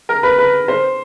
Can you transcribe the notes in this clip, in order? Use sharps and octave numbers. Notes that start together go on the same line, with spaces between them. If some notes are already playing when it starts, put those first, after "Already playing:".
A#4
B4
B4
C5